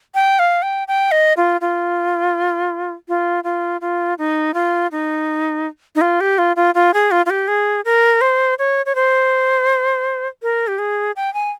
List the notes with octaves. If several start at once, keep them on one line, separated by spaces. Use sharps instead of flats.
G5
F5
G5
G5
D#5
F4
F4
F4
F4
F4
D#4
F4
D#4
D#4
F4
G4
F4
F4
F4
G#4
F4
F4
G4
G#4
A#4
C5
C#5
C#5
C5
A#4
G4
G#4
G5
G#5